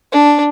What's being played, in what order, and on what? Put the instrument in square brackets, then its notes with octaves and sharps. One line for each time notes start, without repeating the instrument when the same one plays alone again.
[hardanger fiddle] D4